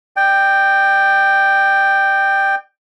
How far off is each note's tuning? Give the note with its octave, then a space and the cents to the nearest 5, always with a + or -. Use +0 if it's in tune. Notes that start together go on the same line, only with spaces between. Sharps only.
D5 +35 G5 +0